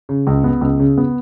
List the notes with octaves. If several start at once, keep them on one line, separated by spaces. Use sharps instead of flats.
C#3
C#2
B3
C#2
C#3
B3